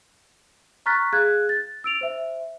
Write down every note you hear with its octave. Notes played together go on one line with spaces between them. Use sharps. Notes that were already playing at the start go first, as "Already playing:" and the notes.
A#5 C#6 F6 F#6 A6 B6
G#4 F5 F#6 G#6
A6
E6 D7 F7
C5 E5